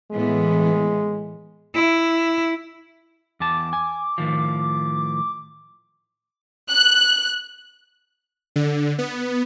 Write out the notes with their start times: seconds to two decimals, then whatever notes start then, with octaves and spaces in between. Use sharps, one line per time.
0.12 A2 E3 G#3 B3
1.75 E4
3.40 E2 A5 D6
3.73 G#5
4.18 A2 D#3 F3
6.70 F#6
8.56 D3
8.99 B3